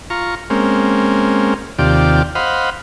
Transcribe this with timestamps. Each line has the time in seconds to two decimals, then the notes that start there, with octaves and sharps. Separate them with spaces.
0.10 F4 A#5 C#6
0.50 G#3 A#3 C4 C#4
1.79 D#2 C3 F4 G4 D5
2.35 C5 D#5 F5 F#5 B5